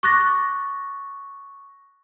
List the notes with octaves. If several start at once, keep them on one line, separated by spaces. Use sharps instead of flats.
C#6 D6 F#6 A6 A#6